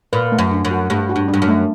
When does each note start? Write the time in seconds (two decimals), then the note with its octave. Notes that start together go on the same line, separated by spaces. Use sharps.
0.13 A#2 B4
0.32 A3
0.39 F#2
0.52 D4
0.65 F#2
0.71 F#4
0.90 G2 A3
1.09 F#4
1.16 G2
1.28 D4
1.34 G2
1.42 F#2
1.48 A3